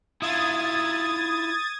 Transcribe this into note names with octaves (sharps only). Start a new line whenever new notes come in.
E4 F4 D#6 G#6 A6